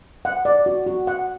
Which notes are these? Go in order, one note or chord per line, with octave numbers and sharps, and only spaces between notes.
F#5
D5
F#4
F#4
F#5